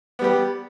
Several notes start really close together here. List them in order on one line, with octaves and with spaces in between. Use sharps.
B3 G3 G4